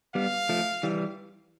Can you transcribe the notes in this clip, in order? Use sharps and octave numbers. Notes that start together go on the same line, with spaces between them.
G3 B3 F5
F3 A3
E3 G3